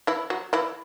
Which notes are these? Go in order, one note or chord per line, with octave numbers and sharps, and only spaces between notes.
E3 E4
F#3 F#4
E3 E4